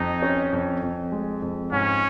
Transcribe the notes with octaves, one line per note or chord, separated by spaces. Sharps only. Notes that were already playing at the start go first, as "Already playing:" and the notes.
Already playing: F2 D#4
C#4
F2
F2
G#3
F2
G#2 C#4